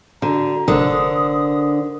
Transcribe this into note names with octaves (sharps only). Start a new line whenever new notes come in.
D3 F#4 A#5
F1 D3 A#4 C5 D#6